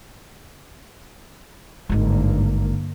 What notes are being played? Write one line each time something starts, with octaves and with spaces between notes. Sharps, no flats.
G#1 G2 D3 A#3 D#4